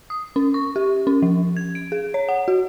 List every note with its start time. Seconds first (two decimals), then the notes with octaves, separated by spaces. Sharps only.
0.10 D#6
0.36 C#4
0.54 C#6
0.76 G4
1.07 C#4
1.22 F3
1.57 G#6
1.75 D7
1.92 G#4
2.14 C#5
2.29 F#5
2.48 F#4